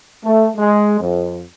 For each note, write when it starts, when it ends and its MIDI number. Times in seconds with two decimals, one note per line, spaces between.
0.25 0.48 57
0.57 0.97 56
1.00 1.41 41